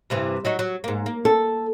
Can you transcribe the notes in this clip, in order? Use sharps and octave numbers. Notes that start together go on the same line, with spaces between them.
G2 C3 E3
F#3 D#4 F#4
F#3
G#2 A#3
A#3
A4